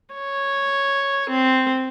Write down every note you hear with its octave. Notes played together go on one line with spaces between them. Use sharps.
C#5
C4